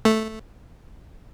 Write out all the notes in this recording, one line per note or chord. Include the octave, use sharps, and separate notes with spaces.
A3